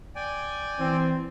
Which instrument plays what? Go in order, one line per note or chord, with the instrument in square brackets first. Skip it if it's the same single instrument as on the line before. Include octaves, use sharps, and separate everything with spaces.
[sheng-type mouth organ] D5 G5 G#5
[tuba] E3 [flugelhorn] C4